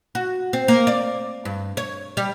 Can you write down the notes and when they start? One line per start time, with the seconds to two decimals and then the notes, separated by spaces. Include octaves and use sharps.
0.15 F#4
0.53 C4
0.68 A#3
0.87 D5
1.45 G2
1.77 C#5
2.17 G3